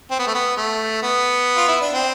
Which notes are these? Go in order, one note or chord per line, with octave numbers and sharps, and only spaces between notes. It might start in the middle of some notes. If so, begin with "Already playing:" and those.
C4
B3
A3
B3
A3
B3
F4
E4
D4
C4